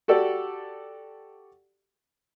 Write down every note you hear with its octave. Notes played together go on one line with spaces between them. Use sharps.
F#4 G4 A4 D5